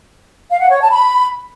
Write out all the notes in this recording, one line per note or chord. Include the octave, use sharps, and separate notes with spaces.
F5
F#5
C#5
A5
B5